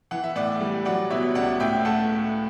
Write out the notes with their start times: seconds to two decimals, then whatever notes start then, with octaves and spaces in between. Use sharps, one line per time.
0.11 E3 F#5
0.24 E5
0.36 A2 D5 F#5
0.60 G3
0.85 F#3 D5 F#5
1.10 B2 C#5 E5
1.35 C#2 D5 F#5
1.60 A2 E5 G5
1.85 A3 F#5 A5